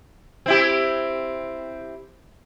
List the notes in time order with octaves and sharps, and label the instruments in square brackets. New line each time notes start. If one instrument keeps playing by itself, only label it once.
[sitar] C4 E4 G4